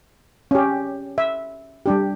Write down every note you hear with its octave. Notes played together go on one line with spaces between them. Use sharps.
C#4 G4
E5
G3 D4 G4